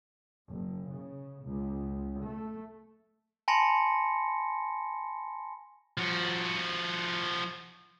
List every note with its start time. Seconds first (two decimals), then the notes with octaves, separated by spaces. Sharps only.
0.51 F#1
0.92 C#3
1.45 C#2
2.24 A3
3.48 G#5 A5 B5 C6 A#6 C#7
5.98 F3 F#4